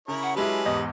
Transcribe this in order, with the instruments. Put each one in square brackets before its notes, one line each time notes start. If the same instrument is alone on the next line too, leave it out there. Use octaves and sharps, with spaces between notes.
[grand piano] C#3 [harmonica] E4 A#4 C#5
[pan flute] F#5
[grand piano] F#3 G#3 E4 [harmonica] C#4 B4 A5 [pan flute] G4
[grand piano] E2 G#2 [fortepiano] D#5